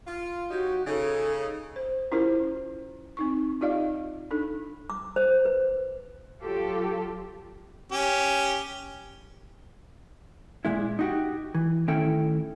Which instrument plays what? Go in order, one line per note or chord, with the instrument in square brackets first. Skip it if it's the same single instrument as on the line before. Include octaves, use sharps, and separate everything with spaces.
[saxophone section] F4
[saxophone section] F#3 D#4 G4 [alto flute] F#4
[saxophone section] C#3 D#4 [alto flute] A4
[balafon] C5
C#4 E4 F4 G4 A#4 C5
C4 D#4 C#6
D#4 F4 G4 D5 D#5 F5
D4 D#4 A4
[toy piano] D6
C5
B4
[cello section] F#3 F4 G4 A4
[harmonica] C#4 G4
[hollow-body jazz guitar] A#2 G#3 E4
D#4 F#4 G4
E3
A2 D#3 C#4 E4 A4 G5